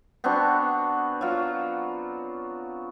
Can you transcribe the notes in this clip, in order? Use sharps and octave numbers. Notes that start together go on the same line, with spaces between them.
B3 C4 D4 F#4
F#3 F4